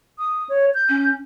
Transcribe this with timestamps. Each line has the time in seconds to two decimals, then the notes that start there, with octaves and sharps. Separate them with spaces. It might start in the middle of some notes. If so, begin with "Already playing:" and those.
0.19 D#6
0.49 C#5
0.75 G6
0.89 C#4